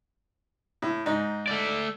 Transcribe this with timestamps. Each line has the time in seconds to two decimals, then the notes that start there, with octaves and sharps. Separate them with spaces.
0.82 A2
1.06 G#2 D#4
1.47 A3 D5